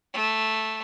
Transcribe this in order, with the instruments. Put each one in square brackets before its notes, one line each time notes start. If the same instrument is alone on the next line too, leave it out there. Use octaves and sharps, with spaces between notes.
[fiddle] A3